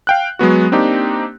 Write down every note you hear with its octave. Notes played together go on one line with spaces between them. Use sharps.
F5 G5 F#6
F#3 G#3 B3 F#4
A#3 C4 D4 D#4 G4